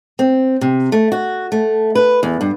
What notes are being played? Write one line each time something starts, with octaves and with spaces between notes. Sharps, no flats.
C4
C3
A3
F#4
A3
B4
E2
G2